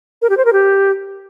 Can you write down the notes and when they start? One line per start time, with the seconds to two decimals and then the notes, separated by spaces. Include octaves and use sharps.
0.22 A#4
0.30 G4
0.37 C5
0.45 A#4
0.53 G4